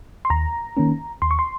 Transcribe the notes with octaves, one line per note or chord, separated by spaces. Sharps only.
C6
D#2 A#5
D#3 A#3 C#4
D#2 C6
C#6
C6